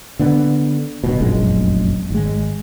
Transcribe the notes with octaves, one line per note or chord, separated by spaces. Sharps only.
D3 B3
D1 B2
F1 A#1 F#2 G#3
G#1 G#3